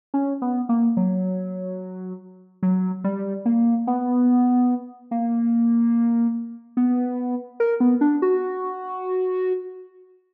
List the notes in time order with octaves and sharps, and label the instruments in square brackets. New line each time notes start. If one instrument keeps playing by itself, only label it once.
[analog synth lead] C#4
B3
A#3
F#3
F#3
G3
A#3
B3
A#3
B3
A#4
B3
D4
F#4